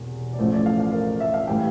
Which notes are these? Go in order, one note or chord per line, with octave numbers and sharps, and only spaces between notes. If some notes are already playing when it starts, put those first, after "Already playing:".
Already playing: E1 E2 C3
D5
A1 A2 F3 A3 C5
D5
F5
F5
A#4
E5
F5
A2 E3 G3 G5